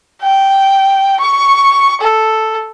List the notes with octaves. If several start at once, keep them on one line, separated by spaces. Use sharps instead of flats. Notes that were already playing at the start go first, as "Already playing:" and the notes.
G5
C#6
A4